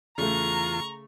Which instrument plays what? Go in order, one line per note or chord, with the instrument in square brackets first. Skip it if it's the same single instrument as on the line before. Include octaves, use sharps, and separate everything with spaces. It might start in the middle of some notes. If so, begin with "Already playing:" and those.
[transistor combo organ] E2 F4 [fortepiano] C#3 A3 [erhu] A#5 [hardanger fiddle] C#6